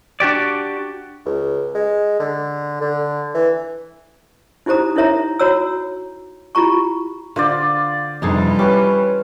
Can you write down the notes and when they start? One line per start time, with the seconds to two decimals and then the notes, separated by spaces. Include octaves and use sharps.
0.20 D4 F#4 G4 D5
1.25 C#2
1.75 G#3
2.20 D3
2.81 D3
3.34 E3
4.66 D#4 E4 G4 C5 A#5 D#6
4.96 D#4 E4 A#4 C#5 E5 A#5
5.40 F#4 C#5 A#5 E6
6.55 E4 F4 G4 A#5 C#6
7.36 D3 F4 C5 D5
8.22 F2 C3 E3 G3 D4 D#4 G#4 A4
8.59 C#4 G4 B4 C#5